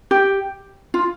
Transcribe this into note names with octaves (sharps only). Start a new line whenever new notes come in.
G4
F4